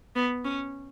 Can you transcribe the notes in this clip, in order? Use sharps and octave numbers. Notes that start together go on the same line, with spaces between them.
B3
C#4